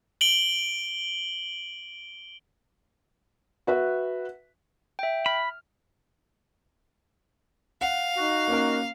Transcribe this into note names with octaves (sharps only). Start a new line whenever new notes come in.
D7 F#7 G7
F#4 B4 E5
E5 G5
B5 F6
F5 F#5
D#4 F#4
A#3 C#4 A#4